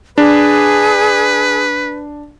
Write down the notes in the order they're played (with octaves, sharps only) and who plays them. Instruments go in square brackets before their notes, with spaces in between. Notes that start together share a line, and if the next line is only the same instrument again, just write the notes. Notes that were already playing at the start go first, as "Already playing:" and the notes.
[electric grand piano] D4 [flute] G#4 [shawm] B4